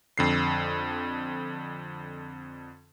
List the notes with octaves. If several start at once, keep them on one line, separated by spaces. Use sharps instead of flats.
F2 D3 C7